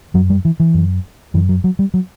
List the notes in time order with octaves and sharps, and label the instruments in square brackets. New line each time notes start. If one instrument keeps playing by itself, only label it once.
[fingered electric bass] F#2 F#3
G3
E3
E3
F#2
F#2 E3
F#3
F#3
G3
F#3